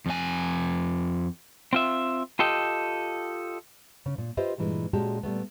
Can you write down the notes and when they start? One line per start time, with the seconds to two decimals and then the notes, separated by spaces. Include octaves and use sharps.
0.06 F2 G#5
1.73 C4 F4 E5
2.39 F4 G4 A4 D#5 G5
4.06 C#3
4.18 A#2
4.37 F4 G4 B4 C5 D#5 E5
4.58 G2 A#2 E3 G#3
4.93 A#2 G#3 C#4 F#4 G4 A5
5.23 A#2 G3 A3 B3